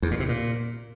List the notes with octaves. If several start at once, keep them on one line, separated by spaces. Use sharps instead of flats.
E2
A#2
C3
A#2